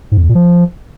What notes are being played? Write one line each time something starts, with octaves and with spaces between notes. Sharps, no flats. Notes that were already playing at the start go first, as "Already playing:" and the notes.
G#2
F2
E2
A#2
F3